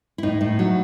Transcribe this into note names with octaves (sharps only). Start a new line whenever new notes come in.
E4
A2 D#4
A2
F#3